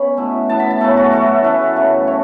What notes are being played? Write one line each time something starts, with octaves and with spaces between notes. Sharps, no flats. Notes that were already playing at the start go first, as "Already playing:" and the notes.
Already playing: B3 C#4 B5
B2 A3 E4
E3 B3 E4 A5
B5
A5
F#2 C#3 A3 A4
F#4
E3 A3 E4 A4
E3 C#4 E4 B4
F#2 C#3 A3 C#4
C#5